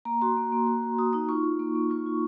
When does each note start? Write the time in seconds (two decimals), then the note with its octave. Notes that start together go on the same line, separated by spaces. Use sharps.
0.05 A#3 A#5
0.22 F#4 C6
0.37 A#3
0.52 A#3
0.67 F#4
0.83 A#3
0.99 F#4 D#6
1.13 D#4 D#6
1.29 F4 C#6
1.44 F4
1.59 A#3
1.75 A#3
1.90 F4 C#6
2.06 F4